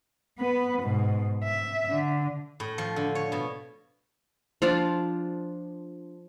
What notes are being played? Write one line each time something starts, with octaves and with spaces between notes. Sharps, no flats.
B3 B4
G#2 B2
E5
D3
A2
F3
D3
C#5
B2
F3 D4 F4 D5